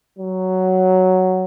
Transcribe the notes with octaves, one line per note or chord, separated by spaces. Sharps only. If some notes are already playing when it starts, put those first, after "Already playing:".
F#3